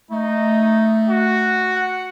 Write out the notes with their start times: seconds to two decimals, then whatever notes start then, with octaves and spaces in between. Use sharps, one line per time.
0.11 A3 D#4
1.09 F#4
1.75 F#5